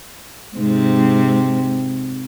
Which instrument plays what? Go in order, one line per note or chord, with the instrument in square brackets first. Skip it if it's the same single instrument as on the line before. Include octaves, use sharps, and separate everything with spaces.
[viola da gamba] G#2 C3 C4